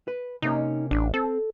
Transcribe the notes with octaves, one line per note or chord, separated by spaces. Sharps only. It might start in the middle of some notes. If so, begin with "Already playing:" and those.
B4
C3 A#3 C#4 D#4
A1 D4
C4 A4